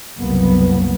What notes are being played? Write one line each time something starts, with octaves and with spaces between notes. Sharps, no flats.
F#1 C2 F#3 A#3 B3